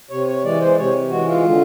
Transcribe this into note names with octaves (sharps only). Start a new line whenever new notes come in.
C3 C#5
C#5
E3 G#3 D5
C5
C3 C#5
E3 G#3 F#4
F4
D3